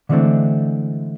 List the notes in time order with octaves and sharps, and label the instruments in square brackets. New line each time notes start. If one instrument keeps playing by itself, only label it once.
[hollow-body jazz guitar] D3 E3 G#3 A3 C4 D4